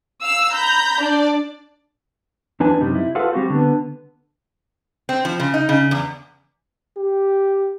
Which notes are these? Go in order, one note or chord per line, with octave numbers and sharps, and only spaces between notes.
F5 E6
A#5 B5 G6
D4 D5
E2 D4 B4 G#5
F#2 C3 G3 D#4
E4
F4 G#4 A4 B4 F5 F#5
G3 C4 F#4 C5
D3 B3
C4
F3
C#3
D#4
C#3
E2
G4